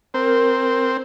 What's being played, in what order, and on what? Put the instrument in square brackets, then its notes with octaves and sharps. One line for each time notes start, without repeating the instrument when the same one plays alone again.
[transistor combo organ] C4 [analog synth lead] A#4